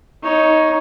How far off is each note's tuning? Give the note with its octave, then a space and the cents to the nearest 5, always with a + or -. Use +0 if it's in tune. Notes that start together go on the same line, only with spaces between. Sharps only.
D#4 +15 C#5 +0